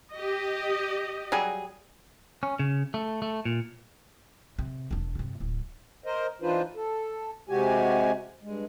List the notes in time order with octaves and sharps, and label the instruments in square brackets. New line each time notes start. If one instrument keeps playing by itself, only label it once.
[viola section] G4 D#5
[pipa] F#3 G3 G#4
[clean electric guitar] C#4
C#3
A3
A3
A#2
[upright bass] C3
E1 D4
G2 C3
D1 E4
[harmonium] A#4 C5 D#5
E3 D4 D#4 F4 B4 C5
A4
C3 G#3 F#4 G4 G#5
G2 G#3